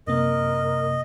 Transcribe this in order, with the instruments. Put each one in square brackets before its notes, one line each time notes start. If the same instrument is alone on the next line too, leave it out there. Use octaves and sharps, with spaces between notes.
[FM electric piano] F#2 C3 A#3 [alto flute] A#4 [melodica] D#5